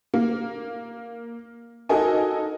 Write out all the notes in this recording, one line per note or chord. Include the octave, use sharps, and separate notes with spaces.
A#3
D#4 F#4 A4 A#4 D#5 G#5